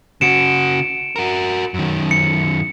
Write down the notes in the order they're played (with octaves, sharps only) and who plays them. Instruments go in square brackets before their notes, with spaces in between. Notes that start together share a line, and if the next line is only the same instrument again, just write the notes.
[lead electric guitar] C#3 F#4 [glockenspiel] C#7 D7 E7
[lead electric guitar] F#4 A#4
F#2 D#3
[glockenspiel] C#7